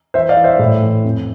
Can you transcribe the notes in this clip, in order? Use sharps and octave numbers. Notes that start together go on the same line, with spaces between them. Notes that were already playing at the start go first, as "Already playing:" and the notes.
E3 C5 E5
D5 F5
E3
C5 E5
A2
E3
F2